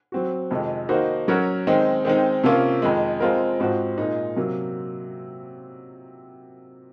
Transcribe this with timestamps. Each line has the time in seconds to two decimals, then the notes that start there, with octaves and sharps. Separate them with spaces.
0.12 F#3 C4 F#4
0.51 F2 C3 D#3 G#3
0.89 D#3 A#3 D#4 F#4 C5
1.28 F#3 C#4 F#4 A#4 C#5
1.67 D#3 G#3 C4 D#4
2.05 D#3 G#3 C4 D#4
2.44 C3 F3 A#3 C#4 F4
2.82 F2 D#3 G#3
3.20 F3 G#3 C4 F4 A#4
3.59 G#2 F3 C4 F#4
3.98 A#2 G#3 D#4
4.36 C3 F#3 A#3